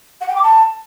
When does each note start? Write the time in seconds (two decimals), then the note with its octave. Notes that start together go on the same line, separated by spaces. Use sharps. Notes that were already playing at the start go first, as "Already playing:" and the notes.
0.21 F#5
0.28 G5
0.36 D6
0.43 A5